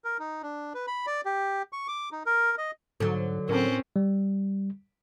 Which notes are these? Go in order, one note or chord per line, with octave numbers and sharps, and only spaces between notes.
A#4
D#4
D4
B4
B5
D5
G4
C#6
D6
D#4
A#4
D#5
G#2 D3 F#3 A4
A2 C4 C#4 A#4 A5
G3